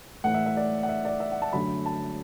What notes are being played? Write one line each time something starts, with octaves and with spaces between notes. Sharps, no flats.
A2 E3 A3 F#5
E5
E5
D5
F#5
E5
D5
E5
F#5
A5
F#2 D3 A3 B5
A5